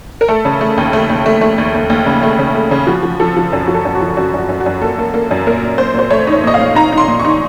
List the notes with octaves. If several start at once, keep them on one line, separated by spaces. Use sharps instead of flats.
A#4
A3 A4
C#3
A3
D#2
A3
D#2
A3
A3
D#2
D#2
D#2
C#3
A3
C#3
A3
C#3
F3 F#4
F3
F3 A4
F3
F#2 A4
F3 F#4
A4
F#2
F#4
F3
F#2 F#4
F#2 F#4
F#2
F#4
F#2
A#3 A4
A#3
A#3
F#2
A#2 A#4
A#2
A#2 C5
A#2 C5
A3 C#5
D#4
C#5
A#2 D#5
F5
A#2
D#4 A#5
D#4
C6
A#2
C#6
D#4